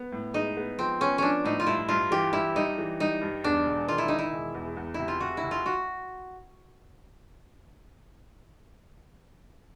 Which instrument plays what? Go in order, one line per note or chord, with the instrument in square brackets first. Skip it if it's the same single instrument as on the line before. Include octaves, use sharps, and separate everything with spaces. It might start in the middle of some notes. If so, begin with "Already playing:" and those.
Already playing: [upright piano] B3
A2
[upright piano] G#3 [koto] D#4
[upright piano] B3
[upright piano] F3 [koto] C4
[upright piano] B3 [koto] C#4
[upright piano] F3 [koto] C#4 D4
[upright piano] A2 [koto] D#4
[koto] F4
[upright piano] G2 [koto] E4
[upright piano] G2 [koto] F4
[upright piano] E3 [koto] G4
[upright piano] G2 [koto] E4
[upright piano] G3 [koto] D#4
[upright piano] E3
[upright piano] G3 [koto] D#4
[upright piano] G2
[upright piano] E2 [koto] D4
[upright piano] E1
[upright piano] D#3 [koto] F4
[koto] E4
[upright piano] D#3 [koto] D#4
[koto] E4
[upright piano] E1
E2
E2
[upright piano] C3 [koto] E4
[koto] F4
[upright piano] F1 [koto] F#4
[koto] E4
[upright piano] F1
[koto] F4
F#4